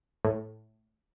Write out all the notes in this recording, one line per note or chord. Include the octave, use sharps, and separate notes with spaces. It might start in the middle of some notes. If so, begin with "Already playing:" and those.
A2